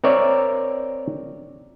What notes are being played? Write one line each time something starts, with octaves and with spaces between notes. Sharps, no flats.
C4 A#4 C#5 D5 E5